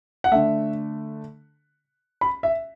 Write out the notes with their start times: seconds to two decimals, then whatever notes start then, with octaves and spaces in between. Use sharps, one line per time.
0.24 F#5
0.32 D3 A3 E5
2.21 B5
2.43 E5